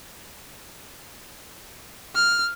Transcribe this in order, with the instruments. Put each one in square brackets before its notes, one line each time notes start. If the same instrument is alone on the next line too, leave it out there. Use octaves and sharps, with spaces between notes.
[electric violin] F6